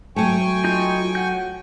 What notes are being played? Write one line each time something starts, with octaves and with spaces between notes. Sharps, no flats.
F#3 A3 G5 G#5 C#6
D#4 F4 G6
F#5 G6